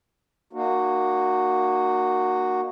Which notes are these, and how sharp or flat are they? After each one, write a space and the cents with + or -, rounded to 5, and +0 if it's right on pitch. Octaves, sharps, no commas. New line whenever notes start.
A#3 +0 D#4 -40 F#4 +0